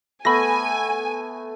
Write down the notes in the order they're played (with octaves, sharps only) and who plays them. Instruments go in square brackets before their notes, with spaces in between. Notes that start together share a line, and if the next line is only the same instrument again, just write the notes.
[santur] A3 B3 [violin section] G#5 [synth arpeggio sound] B5 A#6